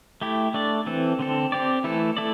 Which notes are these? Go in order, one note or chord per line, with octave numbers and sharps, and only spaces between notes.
A3 E4 G4
A3 D4 A4 D5
E3 C4 A4
D3 C4 A4
C4 G4 D5
E3 A3 E4 A4
A3 E4 A4 D5